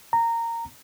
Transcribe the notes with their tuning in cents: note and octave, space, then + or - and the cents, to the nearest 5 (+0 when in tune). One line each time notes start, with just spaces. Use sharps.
A#5 -15